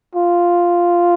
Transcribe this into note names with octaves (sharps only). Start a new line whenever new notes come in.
F4